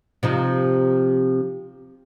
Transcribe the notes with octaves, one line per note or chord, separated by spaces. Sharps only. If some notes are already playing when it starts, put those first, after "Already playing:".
C3 F3 D#4